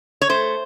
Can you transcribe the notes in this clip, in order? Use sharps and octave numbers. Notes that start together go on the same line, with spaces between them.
C#5
A3 C5